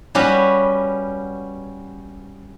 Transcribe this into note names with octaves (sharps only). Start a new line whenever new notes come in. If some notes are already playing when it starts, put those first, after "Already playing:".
G3 C#4 F#4 B4